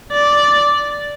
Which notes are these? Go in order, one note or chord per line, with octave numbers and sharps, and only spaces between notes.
D5